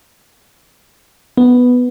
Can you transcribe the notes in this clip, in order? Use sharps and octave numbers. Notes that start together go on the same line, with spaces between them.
B3